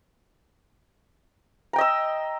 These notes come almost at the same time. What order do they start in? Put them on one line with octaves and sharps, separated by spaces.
A#5 G5 D#5 E6